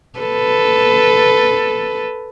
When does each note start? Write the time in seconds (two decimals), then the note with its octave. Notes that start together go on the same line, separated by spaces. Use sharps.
0.20 A4 B4